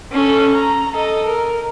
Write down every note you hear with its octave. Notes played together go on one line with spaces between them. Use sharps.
C#4 A4
A#5
A4 D#5
A#4